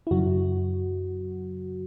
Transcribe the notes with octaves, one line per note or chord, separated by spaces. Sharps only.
E4
F#2 C#3 F#3 F#4